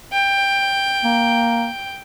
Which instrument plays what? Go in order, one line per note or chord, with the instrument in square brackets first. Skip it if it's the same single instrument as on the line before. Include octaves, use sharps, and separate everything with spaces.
[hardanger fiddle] G5
[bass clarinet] A#3